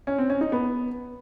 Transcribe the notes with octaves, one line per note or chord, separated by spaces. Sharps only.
C#4
C4
C#4
D#4
B3